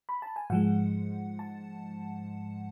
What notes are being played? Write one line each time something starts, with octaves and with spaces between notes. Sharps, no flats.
B5
A5
G#5
G#2 F3 G#3 F#5
A5